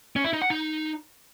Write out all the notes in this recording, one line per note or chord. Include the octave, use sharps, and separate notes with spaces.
C#4
E4
D#4
F#5
D#4